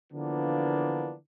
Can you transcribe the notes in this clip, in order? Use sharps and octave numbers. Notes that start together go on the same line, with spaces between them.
D3 E3 F3 A#3 B3 D4